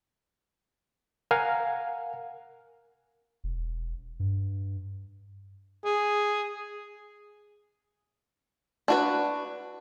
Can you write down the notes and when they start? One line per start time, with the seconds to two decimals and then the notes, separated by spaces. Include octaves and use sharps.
1.31 A#4 F5 F#5 G#5
3.44 E1
4.20 G2
5.85 G#4
8.88 D4 F#4 B4